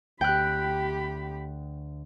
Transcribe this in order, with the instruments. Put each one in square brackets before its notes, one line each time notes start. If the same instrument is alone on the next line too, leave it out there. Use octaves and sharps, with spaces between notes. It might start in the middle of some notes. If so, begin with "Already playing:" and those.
[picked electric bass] D2 [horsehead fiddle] G4 B5 [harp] G5 F#6